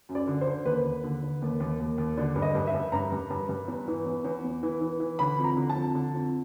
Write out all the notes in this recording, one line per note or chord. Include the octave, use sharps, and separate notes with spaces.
F#2
D5
D3
C5
D3
D#2 B4
D#2
D3
D3
D#2
D#2
D#2
D#2
D3 D5
G2
D#5
G2
E5
G2
G2 A#5
G2
G2
G2
E2
E3
E2
E2
E2
E3
E3
E3
D3 B5
F2
A#5
D3
A5
F2
D3
F2